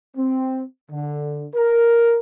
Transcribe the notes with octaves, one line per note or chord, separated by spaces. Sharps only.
C4
D3
A#4